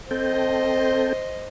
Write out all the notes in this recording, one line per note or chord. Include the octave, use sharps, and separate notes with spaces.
C4 A4 C5 D#5 G5